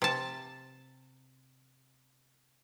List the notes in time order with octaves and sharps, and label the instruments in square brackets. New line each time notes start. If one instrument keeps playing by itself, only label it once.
[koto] C3 A5